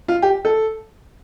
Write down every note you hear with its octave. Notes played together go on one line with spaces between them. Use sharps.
F4
G4
A4